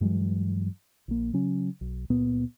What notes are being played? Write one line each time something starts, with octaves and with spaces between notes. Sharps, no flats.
G2 E3 F#3 G#3
A#1 A#3
C#3 F#3 C#4
B1
C#2 A#2 B3